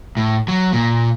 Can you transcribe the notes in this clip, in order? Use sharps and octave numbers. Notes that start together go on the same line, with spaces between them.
A2
F#3
A#2